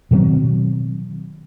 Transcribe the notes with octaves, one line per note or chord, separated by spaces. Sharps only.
B2 D#3 F#3 C4